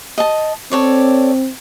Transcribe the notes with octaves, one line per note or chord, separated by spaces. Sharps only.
D#5 A5
C4 A4 C#5 D5